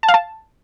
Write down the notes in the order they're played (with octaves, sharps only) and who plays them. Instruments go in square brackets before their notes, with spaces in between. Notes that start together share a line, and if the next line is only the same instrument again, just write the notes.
[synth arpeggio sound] A5
F5
A5